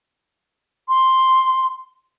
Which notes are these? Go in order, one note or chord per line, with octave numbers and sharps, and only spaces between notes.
C6